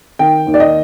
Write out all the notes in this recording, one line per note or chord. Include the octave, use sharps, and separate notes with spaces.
D#3 G5
D#2
D5
D#5